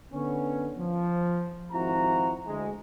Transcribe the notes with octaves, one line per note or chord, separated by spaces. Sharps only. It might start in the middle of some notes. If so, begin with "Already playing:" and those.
D3 B3 C#4
F3
G#1 F3 C4 E4 F#4 A#5
D2 G#3